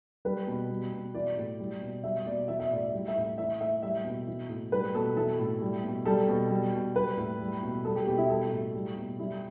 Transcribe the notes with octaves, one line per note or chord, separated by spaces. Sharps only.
G3 B4
B2
G3
B2
E3 D5
A2
G3
B2
G3 E5
B2 D5
E3 E5
E5
A2 D5
E5
G3
E5
A2
E3 E5
A2 E5
G3 E5
B2
E3
A2
G3 B4
B2 A4
E3 A4
A2
G3
B2
G3 A4
B2
G3
B2
G3 B4
A2
G3
B2
G3 A4
G4
B2 G4
E4
G3 A4
A2
G3
B2
G3 E4